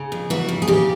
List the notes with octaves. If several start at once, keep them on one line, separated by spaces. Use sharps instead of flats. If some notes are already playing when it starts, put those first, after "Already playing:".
Already playing: C#3
F2
E3 F#4
F2
G#4
C#3 G4